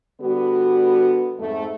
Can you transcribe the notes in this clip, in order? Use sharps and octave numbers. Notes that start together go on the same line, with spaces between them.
D3 G3 B3 F#4
F2 G#2 A3